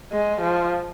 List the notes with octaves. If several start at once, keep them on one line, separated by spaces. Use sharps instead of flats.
G#3
F3